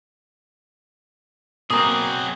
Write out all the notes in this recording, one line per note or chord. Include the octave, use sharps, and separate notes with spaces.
B2 F#3 A#3 C4 G#4 A#4 D#6